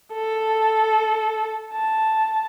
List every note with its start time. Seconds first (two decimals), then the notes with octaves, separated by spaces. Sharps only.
0.13 A4
1.73 A5